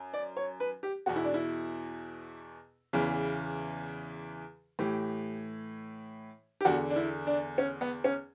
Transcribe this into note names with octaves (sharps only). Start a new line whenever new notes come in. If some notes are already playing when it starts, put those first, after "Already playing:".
Already playing: F#2
D5
C#5
B4
G4
E2 B2 F#4
E4
D4
E4
E2 C#3 E3
A2 E3 G4
G4
E2 D3 F#4
D4
E4
D4
C#4
B3
C#4